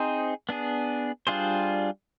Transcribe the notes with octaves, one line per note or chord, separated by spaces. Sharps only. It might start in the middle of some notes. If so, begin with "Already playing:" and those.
Already playing: C4 D#4 G#4 C5
B3 D4 G#4
G3 D4 F4 G#4 C5